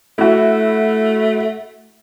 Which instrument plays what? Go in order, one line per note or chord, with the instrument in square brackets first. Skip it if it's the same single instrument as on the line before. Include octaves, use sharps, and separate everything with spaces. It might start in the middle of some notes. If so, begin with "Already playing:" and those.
[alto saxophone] A3 [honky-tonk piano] E4 F#4